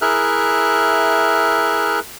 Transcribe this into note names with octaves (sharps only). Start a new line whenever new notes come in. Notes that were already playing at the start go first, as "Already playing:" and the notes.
E4 G#4 A#4 E5 F6 F#6